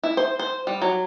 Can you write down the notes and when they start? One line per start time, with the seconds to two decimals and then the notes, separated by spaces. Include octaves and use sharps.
0.03 E4
0.17 C5
0.39 C5
0.67 G3
0.82 F#3